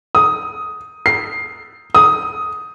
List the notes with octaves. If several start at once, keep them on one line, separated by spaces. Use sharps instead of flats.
D#6
C7
D#6